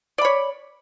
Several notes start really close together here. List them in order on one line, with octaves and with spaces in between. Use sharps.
D5 B5 C#5